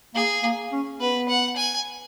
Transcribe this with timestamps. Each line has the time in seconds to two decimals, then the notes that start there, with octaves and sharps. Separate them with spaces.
0.15 A#3 G#4
0.43 A#3
0.72 C#4
1.00 B3 B4
1.29 F#5
1.57 G#5